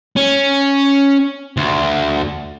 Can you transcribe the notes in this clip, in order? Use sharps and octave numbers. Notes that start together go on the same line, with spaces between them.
C#4
D2